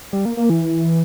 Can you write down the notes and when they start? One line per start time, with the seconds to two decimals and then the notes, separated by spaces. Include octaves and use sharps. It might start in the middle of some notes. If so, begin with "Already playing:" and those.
0.13 G3
0.25 A#3
0.37 A#3
0.50 E3